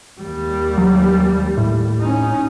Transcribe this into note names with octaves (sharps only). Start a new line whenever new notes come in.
D#2 G3
F#3
A2
C#4 D#4